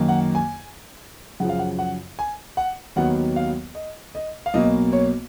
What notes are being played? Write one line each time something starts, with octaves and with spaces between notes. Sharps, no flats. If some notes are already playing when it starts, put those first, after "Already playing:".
Already playing: F#2 D#3 A#3
F#5
G#5
F#2 C#3 F3 F#5
F5
F#5
F#5
G#5
F#5
D#2 D#3 F#3 B3 F#5
F5
D#5
D#5
F5
B1 B2 A#3 D#5
C#5